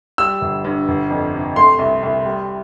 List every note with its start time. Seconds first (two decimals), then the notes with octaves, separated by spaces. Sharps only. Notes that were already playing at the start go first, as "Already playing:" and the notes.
0.18 G3 E6
0.41 G1
0.64 G2
0.88 G1
1.10 F2
1.33 C3
1.56 A3 C6
1.79 C2
2.03 C2
2.26 G3